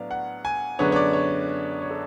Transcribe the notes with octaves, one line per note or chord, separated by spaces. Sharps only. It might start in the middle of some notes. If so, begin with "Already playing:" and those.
Already playing: A2 F#3 B3 D4 D5 F5
F#5
G#5
F#2 D3 G#3 B3 D4 C#5
C#5
D5
C#5
C#5
A4